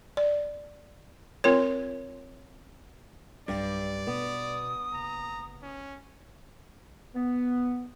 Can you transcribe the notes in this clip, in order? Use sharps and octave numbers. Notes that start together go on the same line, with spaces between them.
D5
C4 F4 A#4 C#5
B1 G2 D5
B2 B3 D#6
F#1 A#5
C#4
B3